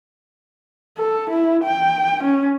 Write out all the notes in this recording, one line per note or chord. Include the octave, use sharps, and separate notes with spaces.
A4
E4
G5
C#4